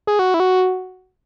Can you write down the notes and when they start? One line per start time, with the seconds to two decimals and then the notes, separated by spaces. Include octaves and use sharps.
0.07 G#4
0.19 F#4
0.34 E4
0.40 F#4